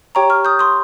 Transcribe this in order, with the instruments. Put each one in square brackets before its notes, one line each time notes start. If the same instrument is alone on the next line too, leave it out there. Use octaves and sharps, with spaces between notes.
[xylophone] G4 C#5 G5 A#5 C#6
C#6 F6
D#6 G6
C6 D#6